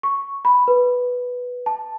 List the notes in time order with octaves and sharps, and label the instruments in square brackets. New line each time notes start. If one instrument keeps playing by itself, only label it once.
[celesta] C#6
B5
B4
A5